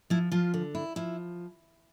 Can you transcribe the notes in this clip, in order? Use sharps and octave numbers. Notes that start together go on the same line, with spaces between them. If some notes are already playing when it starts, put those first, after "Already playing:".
F3 E4
F3 F4
D3
E4
F3 E4